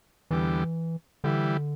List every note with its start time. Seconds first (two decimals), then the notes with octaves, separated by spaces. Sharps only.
0.31 E2 D3 E3 G3
1.24 D3 E3 G3